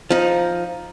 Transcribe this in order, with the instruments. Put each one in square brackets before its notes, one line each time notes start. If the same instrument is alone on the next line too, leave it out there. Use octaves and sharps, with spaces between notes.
[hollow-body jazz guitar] F3 D#4